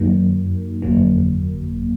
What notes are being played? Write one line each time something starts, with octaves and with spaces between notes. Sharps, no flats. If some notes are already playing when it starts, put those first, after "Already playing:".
Already playing: F#2 D#3 F#3 A#3
G1 F2 D3 F#3 A#3